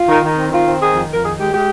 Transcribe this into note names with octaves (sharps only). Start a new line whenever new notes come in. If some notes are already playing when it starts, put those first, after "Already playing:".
Already playing: F4
D#3
D#3
C4
D#3 F4
C4
D#3 G#4
F2
F2 A#4
D#3 G#4
G#3 G4
G#3 G4